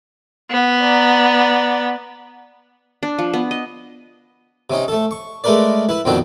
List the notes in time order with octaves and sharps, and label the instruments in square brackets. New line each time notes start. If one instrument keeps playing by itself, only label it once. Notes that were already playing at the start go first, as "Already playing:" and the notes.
[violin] B3
[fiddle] D5 A#5
[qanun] D4
F3
B3
D#5
[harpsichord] C3 C#4 D#4
A3 A4
C#6
G#3 A3 A#4 B4 D5
E4 B4
F2 B2 D#3 C4 D4 G5